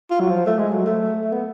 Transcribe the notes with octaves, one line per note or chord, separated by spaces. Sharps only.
F4
F#3
F3
A3
G#3
F#3
A3
A3
B3